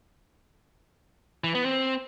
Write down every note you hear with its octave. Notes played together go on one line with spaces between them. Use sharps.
E3
B3
C4